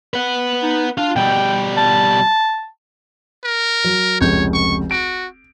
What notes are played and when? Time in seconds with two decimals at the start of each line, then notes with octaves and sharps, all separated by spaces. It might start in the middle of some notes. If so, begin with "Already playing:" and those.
0.14 B4 F#5
0.63 D#4
0.98 D4 F4 F5
1.16 B2 G3 G5
1.77 A5
3.44 A#4
3.84 F#3
4.21 F1 C#2 C#5 G6
4.53 C#6
4.91 F#4 D7